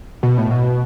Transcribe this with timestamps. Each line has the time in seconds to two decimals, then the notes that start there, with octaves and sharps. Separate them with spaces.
0.23 B2
0.38 A2
0.51 B2